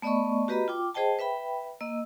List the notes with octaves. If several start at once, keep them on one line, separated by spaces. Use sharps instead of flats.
A3 B3 D5 D#5 B5 C#6
F#4 G4 B4 D#5 A#5 B5
F4 G5 D6
G#4 C5 D#5 G5 A5
B4 E5 G5 B5
A#3 D#5 E6